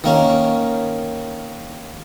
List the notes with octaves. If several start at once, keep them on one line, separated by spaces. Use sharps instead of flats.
D#3 A#3 C#4